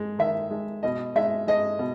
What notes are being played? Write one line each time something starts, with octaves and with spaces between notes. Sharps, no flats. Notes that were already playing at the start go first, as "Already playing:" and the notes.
Already playing: G#3
D#3 E5
G#3
B2 D#5
G#3 E5
G#3 D#5
B2